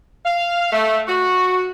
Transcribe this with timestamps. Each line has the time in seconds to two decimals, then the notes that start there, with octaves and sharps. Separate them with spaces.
0.24 F5
0.72 A3
1.07 F#4